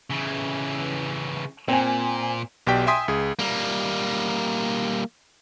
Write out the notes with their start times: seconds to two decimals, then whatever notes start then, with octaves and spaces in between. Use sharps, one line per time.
0.10 C#3 E3
1.68 A#2 C4 G#5
2.67 B1 B2 G4 D5 G5 B6
2.87 E5 G5 G#5 C6 D#6 B6
3.08 C#2 G#4
3.39 G3 A#3